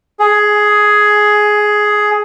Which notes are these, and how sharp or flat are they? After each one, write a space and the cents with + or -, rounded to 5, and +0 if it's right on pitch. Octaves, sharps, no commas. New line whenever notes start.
G#4 +10